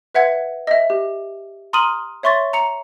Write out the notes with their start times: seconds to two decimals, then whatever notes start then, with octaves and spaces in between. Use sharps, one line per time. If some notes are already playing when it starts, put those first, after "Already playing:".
0.15 B4 E5 F#5 G#6
0.67 D#5 E5
0.90 G4
1.73 A#5 C6 D#6 F6 D#7 F#7
2.23 C#5 E5 C6 C#6 A6
2.53 A#5 C#7 F7